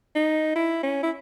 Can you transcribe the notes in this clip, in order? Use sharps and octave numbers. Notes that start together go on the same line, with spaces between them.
D#4
E4
C#4
E4